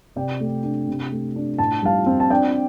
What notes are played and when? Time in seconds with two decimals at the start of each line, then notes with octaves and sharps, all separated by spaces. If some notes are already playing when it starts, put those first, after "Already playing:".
0.16 C3 D5 G5
0.40 A3
0.63 D4
0.88 C3
1.11 A3
1.36 D4
1.58 A2 A5
1.82 G3 F5 A5
2.06 C4
2.20 A5
2.30 D4 D5 G5